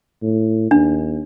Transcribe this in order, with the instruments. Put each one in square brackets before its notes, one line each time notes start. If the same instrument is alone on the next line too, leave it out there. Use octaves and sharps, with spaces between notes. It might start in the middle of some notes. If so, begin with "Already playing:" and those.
[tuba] A2
[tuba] D#2 [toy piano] D4